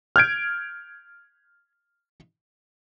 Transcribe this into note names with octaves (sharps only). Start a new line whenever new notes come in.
F6 G6 G#6 D7